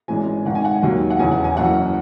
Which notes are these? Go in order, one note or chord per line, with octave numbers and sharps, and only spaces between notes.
G#1 G#2 E3 G#3 C#4 G#5
G#1 G#2 D#3 F#5
G#5
F#5
G#5
D#2 D#3 F#3
F#5
E1 E2 C#3 G#5
F#5
G#5
F#1 F#2 E3 F#5